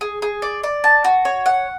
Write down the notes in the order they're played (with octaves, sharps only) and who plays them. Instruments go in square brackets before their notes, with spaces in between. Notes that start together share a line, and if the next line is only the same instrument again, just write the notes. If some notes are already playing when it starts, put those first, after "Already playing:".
[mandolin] G#4
G#4
D5
D5
A5
F#4
C#5
F#5